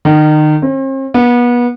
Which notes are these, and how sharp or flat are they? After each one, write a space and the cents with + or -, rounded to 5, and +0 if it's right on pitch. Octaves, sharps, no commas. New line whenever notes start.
D#3 -30
C4 +45
B3 -30